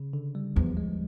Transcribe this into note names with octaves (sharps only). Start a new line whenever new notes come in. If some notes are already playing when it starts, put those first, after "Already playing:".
Already playing: C#3
D3
G3
E2 F3
G#3